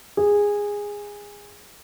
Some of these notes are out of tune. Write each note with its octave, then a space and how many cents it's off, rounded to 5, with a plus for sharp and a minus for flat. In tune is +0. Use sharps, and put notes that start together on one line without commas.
G#4 -15